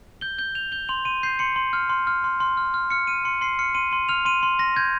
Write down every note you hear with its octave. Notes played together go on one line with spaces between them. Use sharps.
G6 G7
G6 G7
G6 F7
G6 G7
C6 F7
C6 D#7
G6 C7
C6 C#7
C6
F6
C6
F6
C6
C6
F6
F6
F6 C#7
F6 D#7
C6 C#7
C6 C7
F6 C#7
C6 D#7
C6 D#7
F6 F7
C6 D#7
C6
C6 A#6
G6 G#6